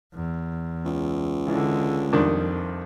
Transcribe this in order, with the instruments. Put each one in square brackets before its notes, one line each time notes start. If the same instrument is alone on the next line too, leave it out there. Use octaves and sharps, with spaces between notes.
[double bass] E2
[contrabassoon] C#2
[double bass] D3 G#3 [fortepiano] E3
[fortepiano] C2 D#3 D4 [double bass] F2